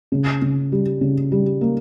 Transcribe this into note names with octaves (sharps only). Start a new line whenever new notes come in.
C#3
C#3
G3
C#3
G3
A#3